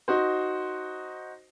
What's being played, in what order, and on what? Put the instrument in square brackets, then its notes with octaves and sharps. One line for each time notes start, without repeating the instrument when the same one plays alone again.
[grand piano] D#4 F#4 C5